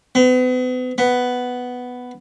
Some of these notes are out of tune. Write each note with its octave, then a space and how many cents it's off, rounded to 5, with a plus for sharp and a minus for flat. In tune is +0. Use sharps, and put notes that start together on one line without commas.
B3 +40
B3 +5